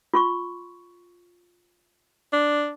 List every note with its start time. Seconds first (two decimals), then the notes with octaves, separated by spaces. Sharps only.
0.14 F4 C6 C#6
2.33 D4